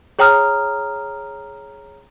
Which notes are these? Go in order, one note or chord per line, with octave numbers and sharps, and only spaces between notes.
G#4 C#5 G5 A#5 D#6 F6